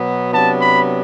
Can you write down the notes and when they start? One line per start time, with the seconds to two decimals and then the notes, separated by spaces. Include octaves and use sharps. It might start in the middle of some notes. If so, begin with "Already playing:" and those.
Already playing: B2 F#3 B3
0.32 C3 F#3 B3 D4 A5
0.60 B5